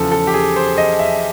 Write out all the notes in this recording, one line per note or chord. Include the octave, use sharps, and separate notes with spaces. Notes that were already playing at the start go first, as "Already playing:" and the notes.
Already playing: E2 C#3 F3 A4
A4
G4
G#4
C5
D#5
E5